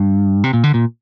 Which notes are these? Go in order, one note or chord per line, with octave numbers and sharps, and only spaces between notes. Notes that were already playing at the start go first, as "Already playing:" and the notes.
Already playing: G2
C3
A#2
D3
A#2